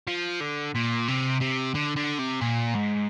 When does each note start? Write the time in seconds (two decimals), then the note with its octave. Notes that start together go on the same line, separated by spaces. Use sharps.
0.08 F3
0.41 D3
0.75 A#2
1.08 C3
1.41 C3
1.75 D3
1.97 D3
2.19 C3
2.42 A#2
2.75 G#2